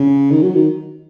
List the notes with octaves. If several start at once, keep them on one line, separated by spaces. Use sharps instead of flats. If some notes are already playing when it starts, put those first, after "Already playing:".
Already playing: C#3
D#3
F#3
D#3